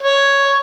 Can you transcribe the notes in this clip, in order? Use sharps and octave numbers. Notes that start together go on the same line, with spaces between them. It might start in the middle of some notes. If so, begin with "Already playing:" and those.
C#5